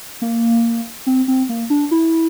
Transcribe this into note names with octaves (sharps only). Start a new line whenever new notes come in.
A#3
C4
C4
A#3
D4
E4